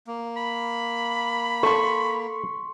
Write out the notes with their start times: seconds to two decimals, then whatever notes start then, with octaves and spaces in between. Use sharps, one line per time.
0.07 A#3
0.37 B5
1.63 A4 C6 C#6